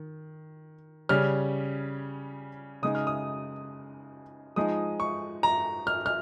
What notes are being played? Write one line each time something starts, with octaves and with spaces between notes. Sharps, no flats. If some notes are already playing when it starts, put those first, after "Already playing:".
Already playing: D#3
C#3 G3 C#4 F6
C#3 G#3 D#4 D#6
F6
D#6
F3 G#3 D#4 D#6
C#6
A#5
F6
F6